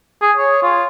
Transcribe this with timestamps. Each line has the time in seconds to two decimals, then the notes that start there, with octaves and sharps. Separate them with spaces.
0.22 G#4
0.37 C#5
0.63 F4